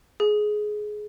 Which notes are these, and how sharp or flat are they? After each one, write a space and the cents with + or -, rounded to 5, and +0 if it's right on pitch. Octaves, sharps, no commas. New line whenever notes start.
G#4 +20